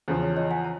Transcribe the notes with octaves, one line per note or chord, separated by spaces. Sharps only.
E2 C#3 F3 C5
C#5
C#5 D#5
F#5 G#5
A#5